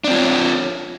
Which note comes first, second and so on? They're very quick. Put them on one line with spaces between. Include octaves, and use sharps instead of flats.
D4 C4 F4 C#5